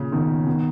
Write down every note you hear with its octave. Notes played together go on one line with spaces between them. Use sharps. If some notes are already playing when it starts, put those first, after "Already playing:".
Already playing: A#2 C#3
B2 D#3
B2 D#3